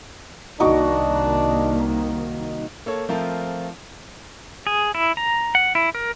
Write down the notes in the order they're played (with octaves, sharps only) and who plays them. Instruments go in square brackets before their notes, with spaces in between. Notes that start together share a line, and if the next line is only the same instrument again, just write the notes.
[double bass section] C2 D#3 A#3 [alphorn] D4 [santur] D#4 F#4 D6
[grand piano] A#3 A4 C#5
F3 A3 C4 F4 A#4
[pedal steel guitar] G#4
E4
A#5
F#5
E4
A#4